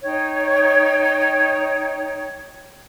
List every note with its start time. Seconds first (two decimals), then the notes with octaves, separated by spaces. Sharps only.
0.03 D#4 C#5 G5